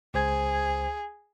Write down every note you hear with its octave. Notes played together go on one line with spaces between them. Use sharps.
C#2 G#4 C5 G#6